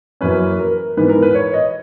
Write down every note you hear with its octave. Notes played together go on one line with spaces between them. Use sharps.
F#2 E3 A#3 C#4 B4
A#4
G#2 E3 B3 B4
A#4
B4
C#5
D#5